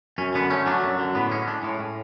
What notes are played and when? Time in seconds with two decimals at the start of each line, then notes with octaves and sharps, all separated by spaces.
0.18 F#2 C#4
0.34 D3 B3
0.50 A3 C#4
0.66 F#3 D4
0.83 F#2
0.99 D3
1.15 A2 B3
1.31 G#3 C#4
1.47 G#3 D4
1.63 A2 C#4
1.80 A2